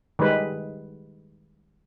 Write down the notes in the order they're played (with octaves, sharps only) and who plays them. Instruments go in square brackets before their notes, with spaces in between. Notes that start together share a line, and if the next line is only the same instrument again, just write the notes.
[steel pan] D#3 G3 G#3 B4